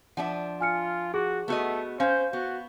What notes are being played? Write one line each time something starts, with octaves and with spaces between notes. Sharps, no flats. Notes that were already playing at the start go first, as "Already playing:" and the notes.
F3 D4 E5 F#5
F4 G#5 F6 C#7
F#4 G#4
A3 B3 F#4 D#5
C#4 C5 F5 G6
B3 F#4